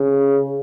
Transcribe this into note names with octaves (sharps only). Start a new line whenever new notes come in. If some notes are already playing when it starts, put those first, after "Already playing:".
Already playing: C#3